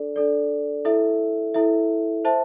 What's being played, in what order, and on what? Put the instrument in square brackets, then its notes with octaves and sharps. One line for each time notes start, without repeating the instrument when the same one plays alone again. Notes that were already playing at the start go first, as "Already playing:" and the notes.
Already playing: [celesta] D4 A4 D5
D4 A4 D5
E4 A4 E5
E4 A4 E5
C5 E5 A5